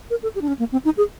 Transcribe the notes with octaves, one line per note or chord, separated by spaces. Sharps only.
A#4
A4
G4
D4
C#4
A#3
C4
D#4
G#4